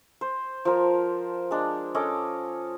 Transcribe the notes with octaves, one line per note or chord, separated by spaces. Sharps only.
C5
F3 A#4
G#3 D4
C#4 A4 D#5 D6